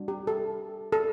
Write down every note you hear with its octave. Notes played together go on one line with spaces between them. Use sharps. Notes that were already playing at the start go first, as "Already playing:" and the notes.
Already playing: G3 D4 F#4
G4
A4
A4